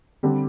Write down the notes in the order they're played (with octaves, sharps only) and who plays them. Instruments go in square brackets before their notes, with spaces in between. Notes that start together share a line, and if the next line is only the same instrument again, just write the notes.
[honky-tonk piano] D3 G3 C4